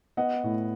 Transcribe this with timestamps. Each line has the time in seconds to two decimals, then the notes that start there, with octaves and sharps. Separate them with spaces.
0.17 B3 D#5 F#5
0.43 A2